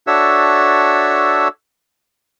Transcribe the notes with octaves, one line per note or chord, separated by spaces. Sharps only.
D4 F#4 A4 C#5 E5 E6